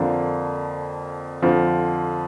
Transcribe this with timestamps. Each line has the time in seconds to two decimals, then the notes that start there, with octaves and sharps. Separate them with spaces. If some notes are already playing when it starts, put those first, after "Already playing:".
Already playing: F2 D3 F3 A#3 D4
1.42 F2 D3 F3